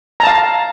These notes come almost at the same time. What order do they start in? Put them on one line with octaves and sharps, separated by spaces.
A#5 A5 F5